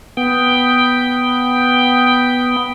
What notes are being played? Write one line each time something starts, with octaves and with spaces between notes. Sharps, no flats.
B3 G5